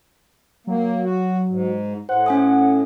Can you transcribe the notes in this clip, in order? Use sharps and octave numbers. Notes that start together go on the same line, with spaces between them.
F#3 A#3
F#4
G#2
A2 C5 F#5
C#4 G#5 D#6